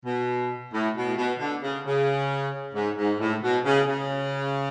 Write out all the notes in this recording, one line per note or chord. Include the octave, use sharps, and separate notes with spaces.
B2
A2
B2
A2
B2
D3
C#3
C#3
G#2
G#2
A2
B2
C#3
C#3